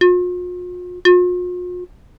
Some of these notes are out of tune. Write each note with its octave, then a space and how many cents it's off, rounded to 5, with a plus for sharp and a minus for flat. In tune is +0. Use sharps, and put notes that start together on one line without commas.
F4 +45
F4 +45